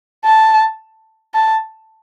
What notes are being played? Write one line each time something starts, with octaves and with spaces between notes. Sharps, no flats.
A5
A5